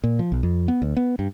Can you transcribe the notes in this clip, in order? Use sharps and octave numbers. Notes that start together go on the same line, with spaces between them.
A#2
F3
B1
F2
B3
D2
B3
G2